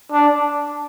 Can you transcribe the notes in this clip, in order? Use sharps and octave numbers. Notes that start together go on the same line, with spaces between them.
D4